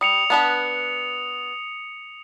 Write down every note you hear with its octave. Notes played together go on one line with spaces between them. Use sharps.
G3 D#6 C#7 F7
B3 D4 B4